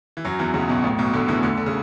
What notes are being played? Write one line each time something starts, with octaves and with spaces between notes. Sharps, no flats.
E3
F#2 F#3
E2 E3
C#2 C#3
B1 B2
A1 A2
B1 B2
D2 D3
E2 E3
D2 D3
D3
C#3